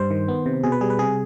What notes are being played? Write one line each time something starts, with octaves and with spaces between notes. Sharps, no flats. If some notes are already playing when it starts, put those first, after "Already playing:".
Already playing: G2 G3 C5
D#3
B3
C3
B2 G#4
B4
G3 G#4
B4
C3 G#4